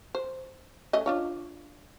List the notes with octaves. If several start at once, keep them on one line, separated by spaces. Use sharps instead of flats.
C5
A3 C#4 D#5
D4 F4 C#5